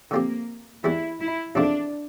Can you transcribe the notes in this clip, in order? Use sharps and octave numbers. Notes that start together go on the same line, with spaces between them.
D3 F3 A#3 C4 G4
E2 E3 G3 E4
E4
E2 C3 F3 A3 D4